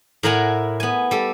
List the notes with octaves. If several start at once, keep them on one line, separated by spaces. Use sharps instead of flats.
A2 E4 A#4 F#5 G#5 A#5
B3 G#5
G3 A4